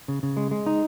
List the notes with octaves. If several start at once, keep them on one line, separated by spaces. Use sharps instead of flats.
C#3
C#3
G#3
G#3
D#4